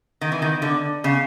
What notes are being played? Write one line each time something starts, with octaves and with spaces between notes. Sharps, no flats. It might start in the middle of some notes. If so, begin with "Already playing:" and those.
D#3
E3
D#3
D3
C#3